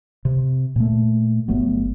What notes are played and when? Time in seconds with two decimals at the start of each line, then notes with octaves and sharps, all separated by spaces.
0.25 C3
0.76 A#2 A3
1.48 G1 F#3 A3 B3